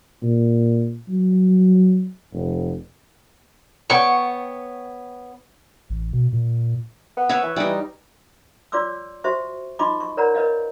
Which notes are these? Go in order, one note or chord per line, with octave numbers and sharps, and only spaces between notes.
A#2
F#3
F1
B3 C#5 G5 C#6
A1
B2
A#2
B3
B4 C#5 E5
E3
E3 G3 D#4
F4 C#5 D5 C6 D6 E6
F#4 C5 E5 C#6
D#4 F4 D#5 B5 C6 D6
C#6
A#4 B4 C#5 D5 F#5 A#5
A#4 B4 C#5 D#5 F5